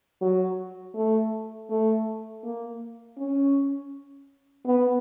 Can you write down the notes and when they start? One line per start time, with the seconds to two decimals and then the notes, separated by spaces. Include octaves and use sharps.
0.21 F#3
0.95 A3
1.70 A3
2.43 A#3
3.18 C#4
4.66 B3